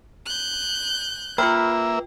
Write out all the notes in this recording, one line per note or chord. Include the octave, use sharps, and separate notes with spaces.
F#6 G6
A#3 F4 B4 E5 G5 B5 F6